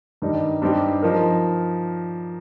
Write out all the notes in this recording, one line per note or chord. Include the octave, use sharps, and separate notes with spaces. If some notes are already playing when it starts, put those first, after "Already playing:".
G2 D#3 G3 D#4
G2 G3 C4 D#4 G4
F3 D#4 A#4